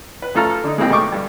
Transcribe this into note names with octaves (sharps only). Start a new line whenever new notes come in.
B4
F#2 A3 F4 A4 A#5 F6
D3 D#4
G#3 A#3 C4 G4
B1 B2 A3 G5 C#6 D6
G2